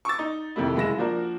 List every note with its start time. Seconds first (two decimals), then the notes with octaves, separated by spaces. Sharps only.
0.05 C#6 D6 E6 A6
0.19 D#4
0.56 F2 C3 D#3 A3 E4
0.76 F#1 G#3 E4 A#6 E7
0.98 F3 A#3 D4 F#4 A#4